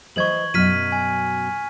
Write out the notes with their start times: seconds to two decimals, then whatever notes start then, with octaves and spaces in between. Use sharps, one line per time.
0.16 E3 C5 D#5 C#6 G#6 F#7
0.54 F#2 B2 F#3 F6 B6 D#7
0.92 G#5